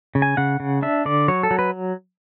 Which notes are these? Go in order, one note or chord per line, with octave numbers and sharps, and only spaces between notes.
C#3
G#5
C#3 F#5
C#3
D4 E5
D3 D5
F#3 C#5
A4
F#3
B4